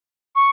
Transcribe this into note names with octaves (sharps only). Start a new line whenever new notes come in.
C#6